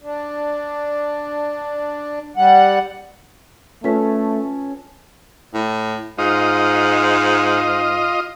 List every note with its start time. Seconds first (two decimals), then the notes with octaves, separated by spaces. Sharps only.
0.02 D4
2.37 G3 F#5
3.84 A3 C#4 F4 A4 B4 B6
5.54 A2
6.18 G#2 F4 D#5